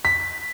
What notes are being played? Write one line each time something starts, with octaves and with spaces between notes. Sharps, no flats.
B6